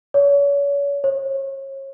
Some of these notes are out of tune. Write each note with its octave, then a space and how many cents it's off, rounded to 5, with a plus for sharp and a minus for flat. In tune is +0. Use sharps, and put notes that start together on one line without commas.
C#5 +35
C#5 -35